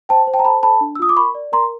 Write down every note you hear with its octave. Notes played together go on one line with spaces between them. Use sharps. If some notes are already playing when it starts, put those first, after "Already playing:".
C5 G5 A5
C5
G5 A5
A#5
A4 A5 B5
A4 A5 B5
D4
E6
F4 D#6
D6
A#4 B5 C#6
D5
A#4 A#5 C6